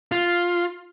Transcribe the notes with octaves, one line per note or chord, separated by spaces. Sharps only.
F4